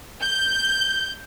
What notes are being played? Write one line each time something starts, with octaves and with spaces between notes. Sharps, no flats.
G6